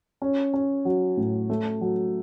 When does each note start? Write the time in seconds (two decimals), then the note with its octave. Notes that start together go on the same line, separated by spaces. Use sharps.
0.22 C#4
0.54 C#4
0.85 F#3
1.17 A2
1.50 A3
1.81 F#3